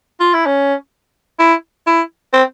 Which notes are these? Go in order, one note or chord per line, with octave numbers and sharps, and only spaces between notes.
F4
E4
C#4
E4
E4
C4